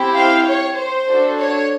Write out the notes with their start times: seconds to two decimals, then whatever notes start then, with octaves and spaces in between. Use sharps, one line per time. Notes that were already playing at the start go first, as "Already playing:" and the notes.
Already playing: C4 E4 G4
0.16 F5 G5
0.47 C#5
0.77 C5
1.09 D4 F#4 A4
1.40 C#5